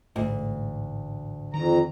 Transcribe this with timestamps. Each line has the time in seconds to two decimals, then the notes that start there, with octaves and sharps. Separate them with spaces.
0.16 A1 D2 G#2
1.54 F2 D#3 A#5